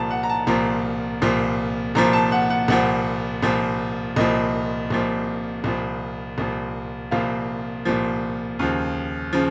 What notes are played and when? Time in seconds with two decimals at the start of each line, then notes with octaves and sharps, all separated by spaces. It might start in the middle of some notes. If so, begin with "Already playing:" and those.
Already playing: C2 A#2 F3 A5 A#5
0.10 F#5
0.23 A#5
0.29 A5
0.47 C2 A#2 F3 A#5
1.22 C2 A#2 F3
1.95 C2 A#2 F3 A#5
2.13 A5
2.32 F#5
2.50 F#5
2.68 C2 A#2 F3 F#5
3.43 C2 A#2 F3
4.16 C2 A#2 F3 D#5
4.90 C2 A#2 F3
5.64 C2 A#2 F3
6.38 C2 A#2 F3
7.11 C2 A#2 F3 F5
7.85 C2 A#2 F3
8.59 D#2 C#3 F3
9.33 C#3 F3